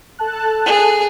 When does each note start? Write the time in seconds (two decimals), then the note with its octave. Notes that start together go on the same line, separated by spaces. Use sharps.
0.19 A4 A5 F#6
0.66 G#4